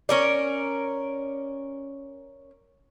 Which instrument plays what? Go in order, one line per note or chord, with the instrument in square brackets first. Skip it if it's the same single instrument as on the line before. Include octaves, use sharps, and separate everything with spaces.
[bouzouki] C#4 A#4 D5